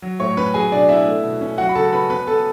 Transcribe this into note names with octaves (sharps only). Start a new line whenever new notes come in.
F#3
A2 C#5 C#6
C#4 B4 B5
F#3 G#4 G#5
B2 D4 D5
B3 E4 E5
A3
B2
C#4
F#3 F#4 F#5
B5
C#3 A4 A5
C#4 B4 B5
B3 B4 B5
B3 A4 A5